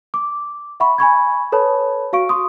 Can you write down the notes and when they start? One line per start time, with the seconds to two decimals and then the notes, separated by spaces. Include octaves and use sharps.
0.14 D6
0.80 E5 F#5 B5 C#6
0.98 G#5 B5 C#6 G#6
1.52 A4 B4 C#5 A5 B5
2.13 F#4 F5 C#6 D7
2.29 C6 C#6 D#6